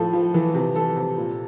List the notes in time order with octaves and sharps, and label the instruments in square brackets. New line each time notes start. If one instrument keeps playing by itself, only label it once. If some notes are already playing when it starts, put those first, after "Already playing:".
Already playing: [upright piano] A2 F3 A4
F3
E3
C3
E3 A4
C3
A#2